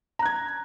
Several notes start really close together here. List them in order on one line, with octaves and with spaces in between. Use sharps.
A#5 F#6 G#6